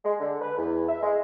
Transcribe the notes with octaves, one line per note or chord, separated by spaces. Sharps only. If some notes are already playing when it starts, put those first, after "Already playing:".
G#3
D3
B4
E2
E5
G#3